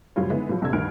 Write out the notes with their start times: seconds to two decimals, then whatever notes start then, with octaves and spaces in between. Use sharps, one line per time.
0.16 F#1 A2 F#3 G3 F4 C#5
0.30 D3 G#3 B3 D#4 E4
0.49 A2 F3 F#3
0.61 F1 A#1 C3 A4 E6 G#6
0.73 G1 D2 A2 D#3 F6 D7